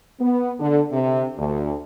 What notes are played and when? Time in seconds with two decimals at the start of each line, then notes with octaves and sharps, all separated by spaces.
0.20 B3
0.60 D3
0.92 C3
1.38 D2